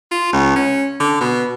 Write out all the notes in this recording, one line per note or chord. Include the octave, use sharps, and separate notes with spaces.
F4
C#2
C#4
D3
B2